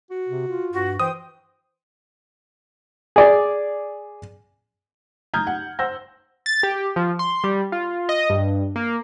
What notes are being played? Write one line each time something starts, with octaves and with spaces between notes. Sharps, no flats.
F#4
C3
F4
G2 F#4
E3 C5 G5 D#6
G#4 D5
A#5 D#6 F6 G6 G#6
F#5
C5 F#5 E6 G6 A#6
A6
G4
F3
C6
G3
F4
D#5
G2
A#3